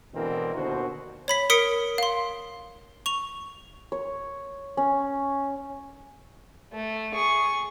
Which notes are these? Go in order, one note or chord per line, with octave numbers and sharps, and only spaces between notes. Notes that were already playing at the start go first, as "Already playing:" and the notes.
B2 D3 E3 G#3 C4 A#4
D#2 B2 D3 F#4 C5
C#5 B5 B6
A#4 D#6 B6 C#7 D7
F5 C6
C#6 F7
C#5
C#4
A3
G#4 C#6